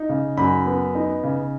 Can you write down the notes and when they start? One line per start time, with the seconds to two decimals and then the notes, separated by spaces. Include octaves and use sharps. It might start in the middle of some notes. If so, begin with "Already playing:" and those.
Already playing: D#4
0.09 C#3
0.37 F#2 B5
0.66 B3
0.95 D#4
1.24 C#3